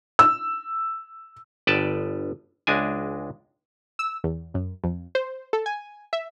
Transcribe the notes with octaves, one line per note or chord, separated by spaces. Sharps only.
E6
G1 B4 D5 G5 A5
C#2 G#3 D4 G#5
E6
E2
F#2
F2
C5
A4
G#5
E5